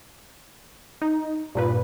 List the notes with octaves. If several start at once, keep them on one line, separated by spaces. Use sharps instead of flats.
D#4
G2 A#2 B4